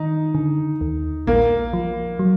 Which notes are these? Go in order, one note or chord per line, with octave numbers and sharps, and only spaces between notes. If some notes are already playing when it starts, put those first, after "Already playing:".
Already playing: D#3 D#4
D3
D#2
A#1 A#3
F3
F#3